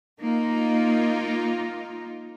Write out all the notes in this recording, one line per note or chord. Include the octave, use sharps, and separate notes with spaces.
A#3 D#4 F4